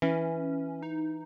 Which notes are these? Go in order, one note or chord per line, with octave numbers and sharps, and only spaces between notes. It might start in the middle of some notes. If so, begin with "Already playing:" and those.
E3 C#4
D#4